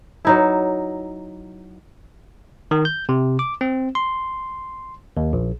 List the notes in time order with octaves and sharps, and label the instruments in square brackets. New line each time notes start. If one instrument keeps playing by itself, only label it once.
[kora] F#3 D#4 E4
[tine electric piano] D#3
G6
C3
D6
C4
C6
D#2
A#1